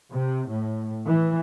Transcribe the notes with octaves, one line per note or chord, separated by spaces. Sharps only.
C3
A2
E3